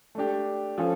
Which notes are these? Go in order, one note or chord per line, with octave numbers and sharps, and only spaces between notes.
A3 D4 G4
F3 C#4 F4 A4